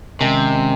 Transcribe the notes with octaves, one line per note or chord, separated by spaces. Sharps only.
C3 D#3 G#3 C#4